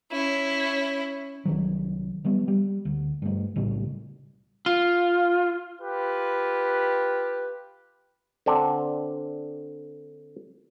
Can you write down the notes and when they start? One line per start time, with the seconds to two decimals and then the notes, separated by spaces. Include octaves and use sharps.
0.11 C#4 E4
1.45 C2 D#3 F#3
2.24 F#3 G3 B3
2.48 G3
2.85 D2
3.22 G2 A3
3.56 B1 A2 C#3 G3
4.66 F4
5.81 F4 G4 B4
8.46 D3 C4 D4